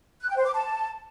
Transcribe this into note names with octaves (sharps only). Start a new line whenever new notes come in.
F#6
G5
C5
D6
A5